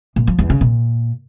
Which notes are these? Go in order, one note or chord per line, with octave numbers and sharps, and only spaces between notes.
A#2
F3
E2
C#3
A#2